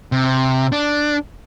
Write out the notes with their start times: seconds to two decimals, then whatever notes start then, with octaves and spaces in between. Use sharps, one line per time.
0.12 C3
0.72 D4